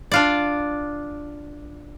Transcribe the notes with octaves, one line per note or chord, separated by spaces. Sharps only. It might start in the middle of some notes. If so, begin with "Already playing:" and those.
D4 F4 D5